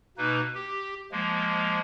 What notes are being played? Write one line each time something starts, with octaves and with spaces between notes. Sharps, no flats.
B2 A#3 D#4 B4
G4
F3 G#3 A#3